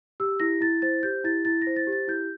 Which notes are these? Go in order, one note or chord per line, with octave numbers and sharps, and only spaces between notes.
G4 E6
E4 A#6
E4 A6
C5 A6
G4 G6
E4 A6
E4 A6
A#6
C5
A6
G4
A6
E4 G6